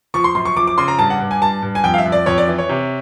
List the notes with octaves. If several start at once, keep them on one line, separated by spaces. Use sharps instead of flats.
F3 C#6
C6
F#2 C6
C#6
F3 D6
D6
C#3 C6
A#5
G2 A5
F#5
G2
G#5
G2 A5
G2
G#5
F2 G5
F5
E5
F2
D5
F2 C#5
D5
E3
C#5
C3